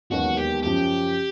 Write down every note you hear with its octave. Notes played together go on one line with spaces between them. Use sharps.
E1 D#2 D#3 F#3 B3 F#4
G4
F#2 C#3 F3 G4